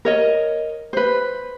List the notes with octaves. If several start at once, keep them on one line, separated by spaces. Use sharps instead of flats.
A#4 C#5 D#5
B4 C5